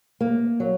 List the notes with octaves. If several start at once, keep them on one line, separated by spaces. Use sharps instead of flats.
A#3
F#3